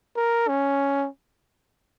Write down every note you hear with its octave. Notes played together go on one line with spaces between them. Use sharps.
A#4
C#4